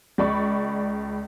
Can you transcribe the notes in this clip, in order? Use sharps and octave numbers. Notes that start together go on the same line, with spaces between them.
C#2 D5 B5 C#6